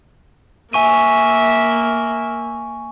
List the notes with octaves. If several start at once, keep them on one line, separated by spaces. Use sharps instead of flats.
A#3 E5 G#5 C#6 D#7